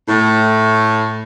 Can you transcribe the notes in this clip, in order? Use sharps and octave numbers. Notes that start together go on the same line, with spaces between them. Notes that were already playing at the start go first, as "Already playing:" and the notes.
A2